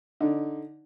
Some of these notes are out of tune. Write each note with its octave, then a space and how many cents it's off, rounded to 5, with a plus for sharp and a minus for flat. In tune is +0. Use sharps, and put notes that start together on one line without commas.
D3 +0 D#4 +0 D5 -5